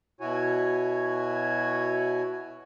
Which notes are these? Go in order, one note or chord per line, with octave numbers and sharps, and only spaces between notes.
B2 E4 F#4 C#5 G#5